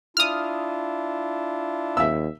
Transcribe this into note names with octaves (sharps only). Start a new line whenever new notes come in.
D4 E4 F4 D#6 F6
D#2 E5 E6